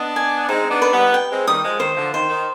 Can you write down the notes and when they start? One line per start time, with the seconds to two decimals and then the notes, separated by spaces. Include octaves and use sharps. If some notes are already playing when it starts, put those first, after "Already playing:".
Already playing: B3 D4 D#5
0.16 G#5
0.49 G#3 C4 D#4
0.70 B3 D4
0.82 B4
0.92 G3 B3
1.14 G5
1.31 G#3 C4
1.47 D#3 G3 D#6
1.63 F3 G#3
1.80 D#3 C5
1.96 D3 F3
2.14 D#3 C5
2.29 D#3